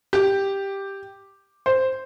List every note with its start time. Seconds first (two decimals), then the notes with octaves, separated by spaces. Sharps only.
0.13 G4
1.66 C5